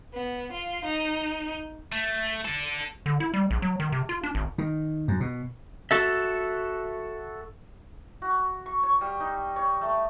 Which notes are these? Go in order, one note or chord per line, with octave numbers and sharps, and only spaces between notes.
B3
F4
D#4
A3
D4 A4
D3
E4
G3
A#1
F#3
D#3
C3
F4
D4
G#1
D#3
F#2
B2
F#4 A4 E5
F#4
C#6
C#5
G3
D#4
C#5
A3